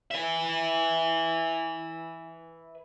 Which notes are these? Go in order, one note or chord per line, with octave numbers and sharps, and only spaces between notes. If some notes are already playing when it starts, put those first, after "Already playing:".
B4 E5